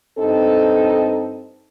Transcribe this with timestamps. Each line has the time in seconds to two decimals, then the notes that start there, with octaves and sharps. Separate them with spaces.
0.19 G2 C4 D#4 A4